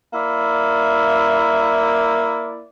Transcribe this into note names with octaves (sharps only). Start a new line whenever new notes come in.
A#3 E4 D5